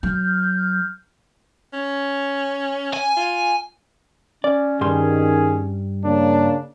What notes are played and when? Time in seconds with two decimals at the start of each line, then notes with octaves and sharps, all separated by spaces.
0.03 F#3 F6 G6
1.73 C#4
2.93 G#5
3.17 F4
4.44 C#4 D5
4.81 G2 D#3 G3 G#4 C6
6.04 C#3 A#3 D4